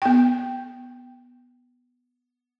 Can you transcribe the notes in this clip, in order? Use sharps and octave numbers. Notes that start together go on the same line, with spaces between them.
B3 G5